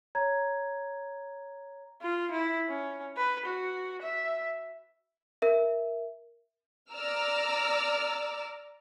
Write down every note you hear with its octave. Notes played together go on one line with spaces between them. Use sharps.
C#5 A#5 G#6
F4
E4
C#4
B4
F#4
E5
A#4 E5
D5 A#5 D6 E6 F6